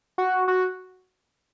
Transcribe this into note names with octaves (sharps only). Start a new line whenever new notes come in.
F#4
F#4